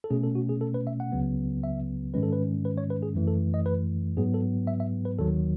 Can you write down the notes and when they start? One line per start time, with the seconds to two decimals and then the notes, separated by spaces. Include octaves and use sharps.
0.04 A4
0.10 B2 A3 C#4 G#4
0.24 A4
0.35 F#4
0.49 G#4
0.61 A4
0.74 B4
0.87 E5
1.00 F#5
1.12 C#2 C#3 F#3 B3
1.63 E5
2.14 G#2 D#3 G#3 C#4 B4
2.23 A4
2.32 B4
2.65 B4
2.78 C#5
2.90 B4
3.03 G#4
3.15 F#2 E3 A3
3.28 A4
3.54 D#5
3.66 B4
4.17 G#2 F#3 B3 G#4
4.34 A4
4.67 E5
4.80 E5
5.05 B4
5.19 D#2 D#3 F#3 A4